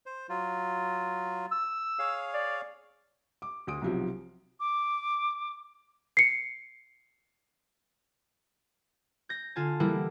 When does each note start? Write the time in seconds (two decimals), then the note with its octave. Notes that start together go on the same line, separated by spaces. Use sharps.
0.06 C5
0.29 F#3 F4
1.52 E6
1.99 G#4 C#5 F5
2.34 D5
3.42 D6
3.67 D2 F#4 D#6 D7
3.82 B1 C3 F3 F#3
4.60 D6
6.17 C7 C#7
9.29 G6 A#6
9.56 D3 F4 G#5 A5
9.80 E3 G3 A#3 B3 E4